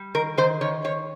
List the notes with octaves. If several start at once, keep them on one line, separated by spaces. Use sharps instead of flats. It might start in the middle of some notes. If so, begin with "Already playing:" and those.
Already playing: G3
D#3 A#4
D#3 C5
D#3 C#5
D#3 C#5